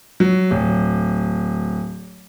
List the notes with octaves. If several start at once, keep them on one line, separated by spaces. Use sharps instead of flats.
F#3
D1